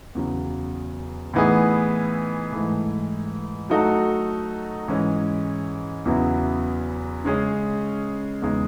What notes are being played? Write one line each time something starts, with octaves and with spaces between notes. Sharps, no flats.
E2 C#3 F#3
A2 E3 B3 D#4 G#4
G#2 E3 A3
F#3 A3 D#4 F#4 A4
G#2 E3 G#3 C#4
E2 C#3 F#3 B3 E4
C#3 G#3 C#4 G#4
E2 C#3 G#3 D#4